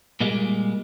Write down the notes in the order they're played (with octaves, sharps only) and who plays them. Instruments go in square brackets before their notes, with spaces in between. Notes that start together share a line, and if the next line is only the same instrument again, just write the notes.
[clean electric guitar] A#2 G3 G#3 A#3